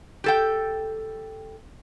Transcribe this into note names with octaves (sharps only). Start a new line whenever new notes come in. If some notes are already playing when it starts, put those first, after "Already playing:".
G4 A4 G5